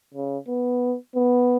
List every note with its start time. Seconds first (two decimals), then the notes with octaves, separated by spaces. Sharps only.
0.14 C#3
0.48 B3
1.16 B3